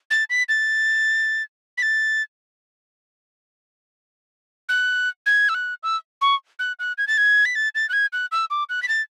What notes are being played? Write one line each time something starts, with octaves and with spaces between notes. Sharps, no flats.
A6
B6
A6
B6
A6
F#6
G#6
E6
F#6
E6
C#6
F#6
F#6
G#6
A6
G#6
B6
A6
A6
F#6
G#6
F#6
E6
D6
F#6
B6
A6